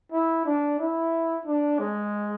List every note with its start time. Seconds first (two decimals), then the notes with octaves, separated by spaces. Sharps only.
0.12 E4
0.46 D4
0.79 E4
1.46 D4
1.79 G#3